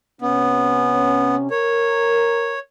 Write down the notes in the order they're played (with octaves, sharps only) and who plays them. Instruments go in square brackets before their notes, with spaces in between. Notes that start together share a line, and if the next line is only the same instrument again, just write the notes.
[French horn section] C3 C#4 [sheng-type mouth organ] B3
[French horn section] A#4 [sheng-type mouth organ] C#5